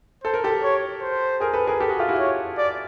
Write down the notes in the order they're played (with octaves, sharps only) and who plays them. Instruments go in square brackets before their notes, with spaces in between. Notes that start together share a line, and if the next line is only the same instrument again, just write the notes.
[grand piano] A4 [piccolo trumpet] C5
[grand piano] A#4
G4 A4
[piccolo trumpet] C#5
C5
[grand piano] G#4 A#4
A4 B4
G#4 A#4
G4 A4
F#4 G#4
F4 G4
E4 F#4
[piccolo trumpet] C#5
D5